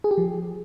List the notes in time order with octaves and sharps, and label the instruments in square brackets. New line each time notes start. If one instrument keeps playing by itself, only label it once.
[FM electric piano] G#4
G4
F3